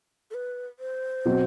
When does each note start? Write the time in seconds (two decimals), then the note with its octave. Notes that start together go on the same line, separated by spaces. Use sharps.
0.31 A4
0.34 B4
0.79 C5
1.25 B2 F#3 C4 F#4